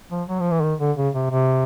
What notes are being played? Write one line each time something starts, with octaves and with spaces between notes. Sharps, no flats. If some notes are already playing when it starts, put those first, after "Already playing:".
F3
F#3
F3
E3
D#3
D3
C#3
C3
C3